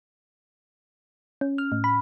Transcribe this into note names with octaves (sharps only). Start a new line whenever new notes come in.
C#4
F6
A2
B5